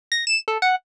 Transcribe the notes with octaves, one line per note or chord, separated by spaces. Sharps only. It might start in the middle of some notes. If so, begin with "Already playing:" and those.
A#6
E7
A4
F#5